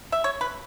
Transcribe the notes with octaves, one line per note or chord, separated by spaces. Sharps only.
E5
C#5
B4